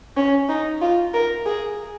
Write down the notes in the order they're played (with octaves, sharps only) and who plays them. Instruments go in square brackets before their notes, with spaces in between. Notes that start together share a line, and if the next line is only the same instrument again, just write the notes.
[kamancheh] C#4
D#4
F4
A#4
G#4